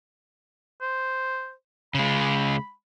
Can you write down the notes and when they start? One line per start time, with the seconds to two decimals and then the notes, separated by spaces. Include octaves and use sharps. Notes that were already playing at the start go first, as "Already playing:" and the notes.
0.81 C5
1.94 C#3 G#3 B5